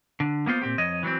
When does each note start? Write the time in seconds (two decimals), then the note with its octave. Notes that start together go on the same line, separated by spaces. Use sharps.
0.20 D3
0.46 A#3 B3 F4 C5
0.62 A#2 C4 G4
0.78 F2 C#5 D#5
1.03 E3 F#3 B3 C4